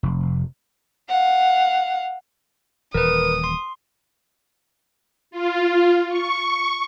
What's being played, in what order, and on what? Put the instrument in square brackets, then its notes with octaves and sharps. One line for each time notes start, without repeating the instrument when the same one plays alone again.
[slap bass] F1
[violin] F5 F#5
[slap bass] D#1 E3 [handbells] A#4 B4 [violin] D#6
[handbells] C6
[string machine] F4
C#6